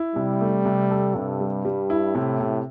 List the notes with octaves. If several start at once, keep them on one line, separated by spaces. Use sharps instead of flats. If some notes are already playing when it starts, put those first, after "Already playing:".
Already playing: E4
C3 G3
A3
C3
A4
G2 C3
G3
G3
E4
A2 C3
C3